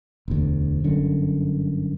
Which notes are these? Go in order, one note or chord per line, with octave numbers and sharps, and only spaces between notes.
E1 D2
G1 F#2 D3